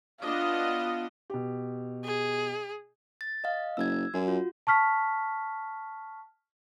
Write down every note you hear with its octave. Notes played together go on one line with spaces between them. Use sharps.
B3 D4 F4 D#5
B2 G4
G#4
A6
D#5 F5
F#1 E6 G#6
F#2 F#4
F4
A5 C#6 F6 B6